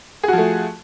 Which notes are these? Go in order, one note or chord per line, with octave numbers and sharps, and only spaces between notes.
F3 A3 F#4 G#4